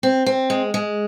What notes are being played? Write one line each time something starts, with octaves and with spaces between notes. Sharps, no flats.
C4
C4
G#3
G#3